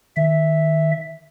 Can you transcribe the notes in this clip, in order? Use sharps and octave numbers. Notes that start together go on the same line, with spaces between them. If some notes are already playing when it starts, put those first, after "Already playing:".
D#3 E5